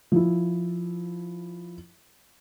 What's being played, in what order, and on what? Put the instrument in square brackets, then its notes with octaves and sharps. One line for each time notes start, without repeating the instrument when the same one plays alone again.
[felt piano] F3 E4